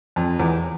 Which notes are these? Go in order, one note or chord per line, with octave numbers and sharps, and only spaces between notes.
F2
E2